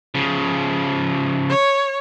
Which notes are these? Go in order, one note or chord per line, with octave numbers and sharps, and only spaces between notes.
C#3 F3
C#5